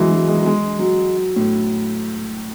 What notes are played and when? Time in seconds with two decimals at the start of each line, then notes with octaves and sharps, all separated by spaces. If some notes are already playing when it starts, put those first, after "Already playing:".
Already playing: E3 F#3 G#3
0.11 F#3
0.28 G#3
0.37 F#3
0.46 G#3
0.79 F#3
1.36 A2